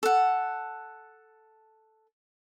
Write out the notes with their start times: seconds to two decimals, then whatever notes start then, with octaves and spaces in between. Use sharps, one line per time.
0.03 A4 F#5